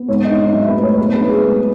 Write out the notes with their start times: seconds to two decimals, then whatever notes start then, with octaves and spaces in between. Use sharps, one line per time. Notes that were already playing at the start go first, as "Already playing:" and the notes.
Already playing: B3
0.08 G#2 C#5
0.24 D#5
0.31 D#4
0.38 D#5
0.53 F#3 E5
0.68 B4
0.76 A3
0.83 C#5
0.98 B2 B4
1.13 B4
1.20 D#4
1.28 G#4
1.43 G#3